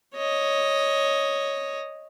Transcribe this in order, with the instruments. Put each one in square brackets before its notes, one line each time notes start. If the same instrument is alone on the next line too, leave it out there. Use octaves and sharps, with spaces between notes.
[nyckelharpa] C#5 D#5